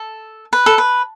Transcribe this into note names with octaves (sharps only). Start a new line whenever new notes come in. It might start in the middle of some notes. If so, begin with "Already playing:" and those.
Already playing: A4
B4
A4
B4